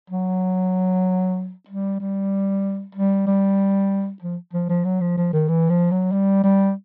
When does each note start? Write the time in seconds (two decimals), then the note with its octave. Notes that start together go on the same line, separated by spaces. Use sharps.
0.10 F#3
1.69 G3
2.00 G3
2.95 G3
3.27 G3
4.22 F3
4.53 F3
4.69 F3
4.85 F#3
5.01 F3
5.17 F3
5.33 D#3
5.48 E3
5.70 F3
5.91 F#3
6.12 G3
6.44 G3